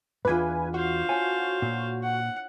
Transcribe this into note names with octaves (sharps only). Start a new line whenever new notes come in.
E2 G#2 D4 E4 F4 B4 G#5
F#4 C5 F5
A4 C#5 G#5
A#2
F#5